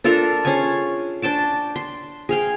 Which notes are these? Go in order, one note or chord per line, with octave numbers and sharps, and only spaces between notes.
D4 F4 A4 A#4
C#4 G#4 F5 G#5
D4 G5 A5 D6
C6
G#4 F5 G5